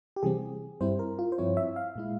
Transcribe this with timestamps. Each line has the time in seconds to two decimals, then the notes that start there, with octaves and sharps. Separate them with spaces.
0.16 G4
0.23 C3 E3 G3 C4 G#4
0.81 G2 G3 C4 E4 C5
0.99 A#4
1.19 F4
1.32 C5
1.38 G2 F3 C4 E4 C#5
1.57 E5
1.76 F5
1.96 A#2 G#3 E4